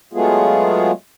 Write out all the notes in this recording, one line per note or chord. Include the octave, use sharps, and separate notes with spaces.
F#3 G#3 A3 B3 F4 G#4